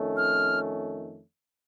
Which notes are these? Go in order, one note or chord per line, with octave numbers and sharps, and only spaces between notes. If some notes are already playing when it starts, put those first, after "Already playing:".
Already playing: F2 D#3 A3 C#4
F6